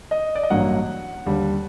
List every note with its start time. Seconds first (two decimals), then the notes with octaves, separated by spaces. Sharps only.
0.11 D#5
0.35 D5
0.43 D#5
0.50 A1 G2 F#3 A#3 F#5
1.26 D#2 D3 G3